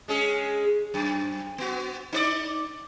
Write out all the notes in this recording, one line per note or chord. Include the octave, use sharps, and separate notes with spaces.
G#3 C#4 G#4
F#2
B3 F#4
D#4 B4 D5